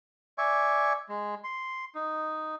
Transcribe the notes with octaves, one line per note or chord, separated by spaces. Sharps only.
D5 E5 G#5 C#6
G#3
C6
D#4